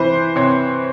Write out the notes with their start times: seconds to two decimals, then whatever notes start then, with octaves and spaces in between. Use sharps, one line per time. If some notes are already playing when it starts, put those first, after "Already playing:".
Already playing: C3 E3 B4 C5
0.36 C3 C#5